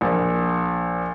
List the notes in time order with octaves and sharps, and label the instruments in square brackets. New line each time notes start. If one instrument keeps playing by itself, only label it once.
[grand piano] A#1